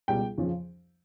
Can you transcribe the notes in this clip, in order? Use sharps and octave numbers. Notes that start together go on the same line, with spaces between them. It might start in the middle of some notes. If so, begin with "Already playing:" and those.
C#2 B2 G3 G5
F2 C#3 F3